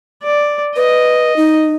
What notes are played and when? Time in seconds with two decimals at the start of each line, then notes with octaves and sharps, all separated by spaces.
0.23 D5
0.76 B4 D#5
1.36 D#4